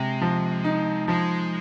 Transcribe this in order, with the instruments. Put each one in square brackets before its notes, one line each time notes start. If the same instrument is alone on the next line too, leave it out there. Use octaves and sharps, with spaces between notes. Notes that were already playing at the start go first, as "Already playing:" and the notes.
Already playing: [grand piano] C3 [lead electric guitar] G#3
[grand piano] F3
D#4
[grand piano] F3 [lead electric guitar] G#3